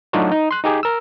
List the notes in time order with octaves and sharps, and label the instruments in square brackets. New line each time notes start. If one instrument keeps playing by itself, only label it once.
[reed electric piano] F#3 A3 D4 D#4 F4 F#4
D#4
C6 F#6
D#4 G4 G#4
A#4 E6